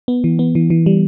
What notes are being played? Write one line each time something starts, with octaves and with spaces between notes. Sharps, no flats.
B3
E3
B3
E3
E3
G3